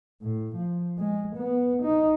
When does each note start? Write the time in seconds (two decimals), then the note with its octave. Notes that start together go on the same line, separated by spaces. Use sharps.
0.22 A2
0.56 F3
0.99 G#3
1.36 B3
1.83 D#4